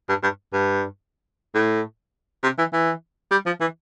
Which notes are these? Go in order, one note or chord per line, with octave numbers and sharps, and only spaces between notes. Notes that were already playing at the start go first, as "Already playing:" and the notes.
G2
G2
G2
A2
C3
E3
E3
G3
F3
E3